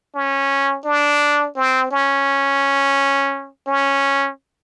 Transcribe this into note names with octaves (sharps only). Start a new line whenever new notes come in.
C#4
D4
C4
C#4
C#4